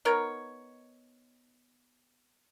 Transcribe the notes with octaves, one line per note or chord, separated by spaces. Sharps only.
B3 D#4 A#4 C#5